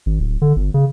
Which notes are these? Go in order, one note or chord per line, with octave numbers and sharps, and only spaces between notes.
G#1
D1
D3
G1
C#3